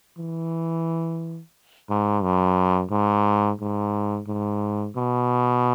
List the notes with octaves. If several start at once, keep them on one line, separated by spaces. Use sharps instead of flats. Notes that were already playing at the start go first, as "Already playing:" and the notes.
E3
G#2
F#2
G#2
G#2
G#2
B2